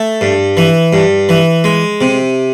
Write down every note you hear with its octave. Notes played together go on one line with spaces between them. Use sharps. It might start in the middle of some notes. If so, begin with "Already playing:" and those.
Already playing: A3
G2
E3
G2
E3
G#3
C3